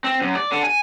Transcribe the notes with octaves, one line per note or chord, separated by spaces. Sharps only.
C4
F#2
D5
D3
G#5